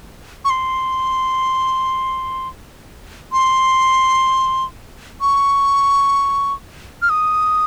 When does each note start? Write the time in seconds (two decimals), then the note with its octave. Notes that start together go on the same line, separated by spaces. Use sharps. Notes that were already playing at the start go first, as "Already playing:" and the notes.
0.45 C#6
0.50 C6
3.32 C6
5.21 C#6
7.02 F6
7.10 D#6